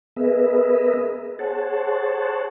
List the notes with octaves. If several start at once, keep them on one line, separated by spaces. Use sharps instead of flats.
B3 G#4 A#4 B4 D#5 E5
G#4 C5 C#5 F#5 A5